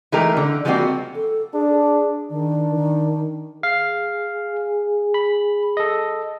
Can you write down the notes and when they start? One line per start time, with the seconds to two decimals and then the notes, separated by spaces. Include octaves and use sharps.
0.12 E3 G#3 A3 D#4 G4 A#4
0.37 D3
0.65 F3 G3 G#3 A#3 C4 F#4
1.15 A4
1.54 D4 G#4
2.30 D#3 D4
2.74 D#3
3.63 G#4 F5
5.14 B5
5.77 A4 D#5